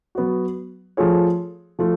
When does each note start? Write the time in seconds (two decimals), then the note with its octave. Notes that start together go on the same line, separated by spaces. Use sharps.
0.15 F#3 B3 F#4
0.97 F3 A3 F4 G#4 C#5
1.79 F3 A3 F4